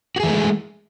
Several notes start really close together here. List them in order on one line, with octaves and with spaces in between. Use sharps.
F#4 G#4 E3 A3 G#3